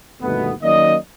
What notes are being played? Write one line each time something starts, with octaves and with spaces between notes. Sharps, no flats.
G1 D#2 B2 A3 B3
D#3 F#3 A#3 C#4 D5 D#5